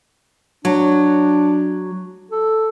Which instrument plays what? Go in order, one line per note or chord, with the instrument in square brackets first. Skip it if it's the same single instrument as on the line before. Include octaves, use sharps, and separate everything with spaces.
[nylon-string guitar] F#3 [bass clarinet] D4
[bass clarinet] A4